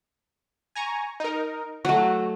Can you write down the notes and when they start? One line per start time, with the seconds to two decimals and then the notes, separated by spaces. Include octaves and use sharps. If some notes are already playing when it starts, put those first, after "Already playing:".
0.75 G#5 A#5 C#6
1.20 D#4 A#4
1.85 F#3 A3 F#4